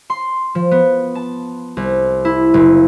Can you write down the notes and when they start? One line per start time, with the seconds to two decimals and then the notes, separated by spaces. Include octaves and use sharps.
0.10 C6
0.55 F3
0.71 B3
1.15 A5
1.77 C2
2.25 E4
2.54 F#1